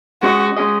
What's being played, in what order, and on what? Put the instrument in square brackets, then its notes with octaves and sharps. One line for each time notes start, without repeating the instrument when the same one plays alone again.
[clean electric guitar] G#3 C#4 G#4 D#5 [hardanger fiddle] F#4
[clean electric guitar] G#3 C#4 G#4 D#5